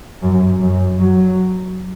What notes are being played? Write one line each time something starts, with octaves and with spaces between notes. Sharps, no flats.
F#2
F#2
F#3